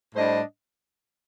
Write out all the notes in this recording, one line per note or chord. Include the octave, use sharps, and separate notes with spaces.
A2 G3 D4 C5 D#5